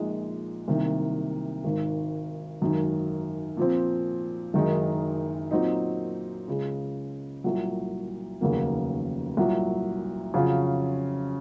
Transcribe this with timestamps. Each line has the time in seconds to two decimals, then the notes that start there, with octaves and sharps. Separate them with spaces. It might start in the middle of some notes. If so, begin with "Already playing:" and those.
Already playing: A#1 A#2 G#3 D#4
0.68 C2 C3 D#3 F#3 A#3
1.64 G#1 G#2 D#3
2.61 G#1 F#2 D#3
3.57 A#2 F3 C4
4.54 F#1 F#2 D#3 G#3 D#4
5.51 A#2 F#3 C4 D#4
6.47 C#2 C#3 G#3
7.44 C2 A#2 F#3
8.41 F1 D#2 C#3 F#3 A#3
9.37 C2 A#2 F#3
10.34 F2 C#3 F#3 C#4 F4